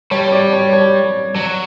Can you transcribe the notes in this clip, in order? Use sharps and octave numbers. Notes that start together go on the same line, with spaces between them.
G3 C#5
C#5
D5
C#5
C#5
F#3 C#5